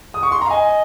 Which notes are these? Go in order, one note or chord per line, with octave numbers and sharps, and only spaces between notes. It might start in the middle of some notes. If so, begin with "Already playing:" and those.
D#6
C#6
C6
A#5
F5
D#5 G#5